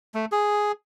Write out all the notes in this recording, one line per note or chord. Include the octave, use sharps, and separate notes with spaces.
A3
G#4